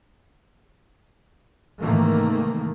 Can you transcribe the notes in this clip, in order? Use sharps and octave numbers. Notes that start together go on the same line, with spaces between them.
G#2 C3 D#3 E3 A3 A#3